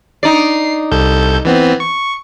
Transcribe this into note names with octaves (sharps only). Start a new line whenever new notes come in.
D#4 D5 C7
C2 A4 G6
E3 B3 C4
C#6